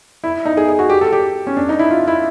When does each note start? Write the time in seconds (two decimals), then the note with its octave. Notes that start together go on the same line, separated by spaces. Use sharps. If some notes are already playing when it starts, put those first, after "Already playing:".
0.24 E4
0.45 D#4
0.57 G#4
0.68 G#4
0.79 F#4
0.89 G4
1.01 A4
1.12 G4
1.47 C#4
1.57 D4
1.69 D#4
1.79 E4
1.91 F4
2.07 E4